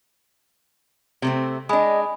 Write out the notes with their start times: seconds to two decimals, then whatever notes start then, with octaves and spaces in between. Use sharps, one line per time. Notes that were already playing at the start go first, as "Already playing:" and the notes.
1.22 C3 A3 C4
1.69 G#3 D4 D#5 G#5 B5 D#6